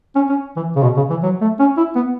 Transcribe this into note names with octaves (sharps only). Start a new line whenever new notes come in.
C#4
C#4
E3
C#3
B2
C#3
E3
F#3
A3
C#4
E4
B3